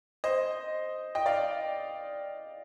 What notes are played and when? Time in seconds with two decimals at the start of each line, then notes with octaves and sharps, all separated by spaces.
0.24 C5 D#5
1.15 D#5 G5
1.26 D5 F5